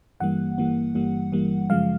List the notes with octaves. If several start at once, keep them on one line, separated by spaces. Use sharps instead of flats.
G1 G2 E3 G3 A#3 F#5
G1 G2 E3 G3 A#3
G1 G2 E3 G3 A#3
G1 G2 E3 G3 A#3
F#2 C#3 F3 G#3 F5